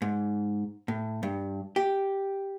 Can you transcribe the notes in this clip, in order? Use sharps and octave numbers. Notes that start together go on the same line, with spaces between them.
G#2
A2
G2
G4